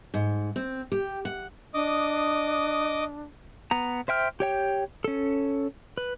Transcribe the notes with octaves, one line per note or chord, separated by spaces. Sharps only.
G#2
C4
G4
F#5
D4 D#5 D6 D#6
B3 A#5
C5 E5 G5 F6
G4 C#5 G5
C#4 A4
B4